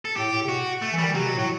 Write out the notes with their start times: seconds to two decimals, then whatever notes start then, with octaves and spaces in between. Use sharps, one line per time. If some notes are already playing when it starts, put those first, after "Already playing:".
0.05 A4
0.16 A2 G4
0.32 A2
0.45 C3
0.49 B2 F#4
0.82 A3
0.93 E3
0.98 D#3 G3
1.14 C3 F#3
1.25 B2
1.37 A2 F#3